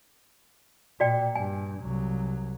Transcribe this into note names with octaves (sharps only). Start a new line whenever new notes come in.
A#2 F#4 D5 G5
G2 G#5
C2 F#3